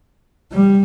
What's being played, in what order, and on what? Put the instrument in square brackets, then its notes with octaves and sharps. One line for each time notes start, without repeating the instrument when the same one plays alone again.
[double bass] G3